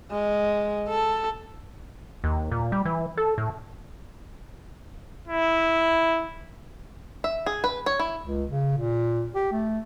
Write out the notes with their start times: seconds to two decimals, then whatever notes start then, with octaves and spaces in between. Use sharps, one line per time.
0.11 G#3
0.89 A4
2.24 D#2
2.52 A#2
2.72 G3
2.85 E3
3.17 A4
3.38 A2
5.27 E4
7.24 E5
7.46 G#4
7.64 B4
7.86 C#5
7.99 E4
8.26 C#2
8.50 C#3
8.78 A#2
9.35 G4
9.53 A3